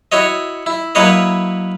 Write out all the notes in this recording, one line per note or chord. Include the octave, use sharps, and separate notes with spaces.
E4 F#4 C#5 D#5
E4
F#3 A#3 E4 B4 C#5 D#5